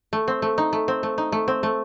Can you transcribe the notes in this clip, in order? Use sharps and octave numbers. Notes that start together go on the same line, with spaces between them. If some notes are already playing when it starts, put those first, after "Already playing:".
A3
C4
A3
D#4
A3
C4
A3
D#4
A3
C4
A3